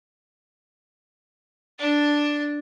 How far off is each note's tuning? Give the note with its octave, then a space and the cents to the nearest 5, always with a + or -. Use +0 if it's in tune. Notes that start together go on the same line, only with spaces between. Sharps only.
D4 +0 A5 +0